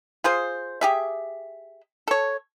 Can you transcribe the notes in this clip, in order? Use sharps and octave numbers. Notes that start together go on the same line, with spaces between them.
F4 G#4 C5
G4 G#4 E5
A4 C#5